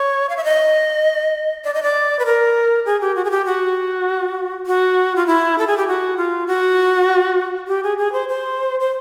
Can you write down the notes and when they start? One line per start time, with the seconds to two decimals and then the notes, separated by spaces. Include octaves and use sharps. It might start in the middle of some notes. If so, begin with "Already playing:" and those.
Already playing: C#5
0.29 F5
0.37 E5
0.44 D#5
1.64 D5
1.74 D#5
1.83 D5
2.19 B4
2.26 A#4
2.86 G#4
3.01 G4
3.16 F#4
3.25 G#4
3.31 G4
3.46 F#4
4.67 F#4
5.16 F4
5.27 E4
5.58 A4
5.67 G#4
5.77 G4
5.87 F#4
6.17 F4
6.47 F#4
7.67 G4
7.84 G#4
7.98 G#4
8.12 C5
8.29 C5
8.80 C5